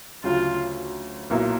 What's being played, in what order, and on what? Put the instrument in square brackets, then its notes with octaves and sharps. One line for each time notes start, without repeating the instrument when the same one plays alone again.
[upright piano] D2 C#3 F#3 [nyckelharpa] F4
[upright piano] B1 A#2 F#3 B3 E4